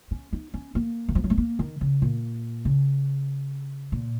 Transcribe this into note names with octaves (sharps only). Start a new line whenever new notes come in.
C#4
D#4
C#4
A#3
D#3
F3
F#3
A3
A#3
D#3
C#3
A#2
C#3
A#2